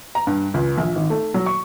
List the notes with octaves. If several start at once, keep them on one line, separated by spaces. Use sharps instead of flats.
A#5
G2
C#2
A#1
G#1
A3
F#3
C#6